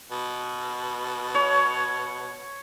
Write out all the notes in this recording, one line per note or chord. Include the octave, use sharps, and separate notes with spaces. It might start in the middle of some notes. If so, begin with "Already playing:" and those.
B2
C#5